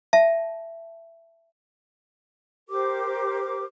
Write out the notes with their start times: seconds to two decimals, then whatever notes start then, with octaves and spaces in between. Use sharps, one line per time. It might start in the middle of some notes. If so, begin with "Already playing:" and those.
0.13 E5 A5
2.69 G4 A#4 C5 D6